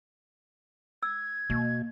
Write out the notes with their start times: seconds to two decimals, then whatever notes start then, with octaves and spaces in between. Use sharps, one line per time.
1.03 E6 G#6
1.50 B2 A#3